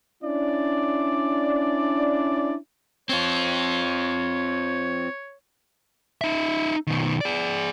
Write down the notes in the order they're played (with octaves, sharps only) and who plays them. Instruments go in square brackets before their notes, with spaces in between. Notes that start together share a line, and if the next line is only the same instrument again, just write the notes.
[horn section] C#4 D4 E4 D5
[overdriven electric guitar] C4 F4 [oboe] C#5
[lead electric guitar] D#4 E5
B2 D#3
G#4 D5